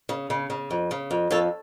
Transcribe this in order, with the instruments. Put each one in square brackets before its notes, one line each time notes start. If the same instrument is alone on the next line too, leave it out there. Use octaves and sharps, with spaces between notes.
[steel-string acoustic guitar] C#3
C#3
C#3
F2
C#3
F2
F2 A4 C#5